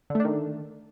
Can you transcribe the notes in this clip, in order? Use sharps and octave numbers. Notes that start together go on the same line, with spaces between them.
D3 D#3 A3 D4